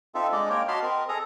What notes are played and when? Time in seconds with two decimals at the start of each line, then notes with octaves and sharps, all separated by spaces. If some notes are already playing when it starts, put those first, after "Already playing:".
0.15 C4 D#4 F4 A4 E5
0.32 G#3 D4 D#4 D5 D#5
0.50 A#3 A#4 C#5 G5
0.68 F#4 D#5 A5 B5 C6 F6
0.83 C4 A#4 D#5
1.09 G#4 A4 A#5 D#6